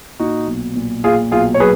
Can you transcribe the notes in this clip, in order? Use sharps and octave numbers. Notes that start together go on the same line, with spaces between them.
A#2 D#4 F#4
B1
A#2
A#2 F4 G#4
B1 F4 G#4
C#5
F#3 G#4 B4